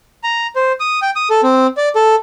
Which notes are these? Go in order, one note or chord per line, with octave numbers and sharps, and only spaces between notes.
A#5
C5
D#6
G5
D#6
A4
C4
D5
A4